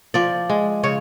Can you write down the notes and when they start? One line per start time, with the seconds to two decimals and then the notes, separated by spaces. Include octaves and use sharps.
0.14 F3 D5
0.50 G#3
0.83 C#3 C#5